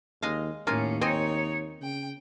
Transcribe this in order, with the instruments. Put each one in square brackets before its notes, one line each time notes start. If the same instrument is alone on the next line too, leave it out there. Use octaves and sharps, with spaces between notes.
[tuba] D#2 [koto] G#3 D#5 F5
[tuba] D#2 [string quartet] A2 C#4 [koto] A#3 F4 G#5
[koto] C4 D#5 G#5 [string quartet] D#4 C#5
[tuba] C#3 [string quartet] G5